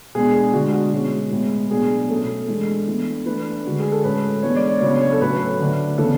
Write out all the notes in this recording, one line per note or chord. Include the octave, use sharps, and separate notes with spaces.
B2 G#3 B3 D4 G#4
G#4
D3 G#3 D4 F#4
F#4
B2 G#3 C#4
A2 G#3 B3
B2 F#3 B3 D4 G#4
B2 A3 C#4 A4
E3 G#3 D4
E3 B3 D4
E3 A3 D4 B4
D3 G#3 D4 F#4
G#4
A4
A2 G#3 C#4 B4
E3 G#3 B3 D4 C#5
D5
C#5
C#3 F#3 B3 D4 C#5
C#5
A4
A2 F#3 C#4 B4
D3 A3 D4
C#3 E3 B3 D4 A4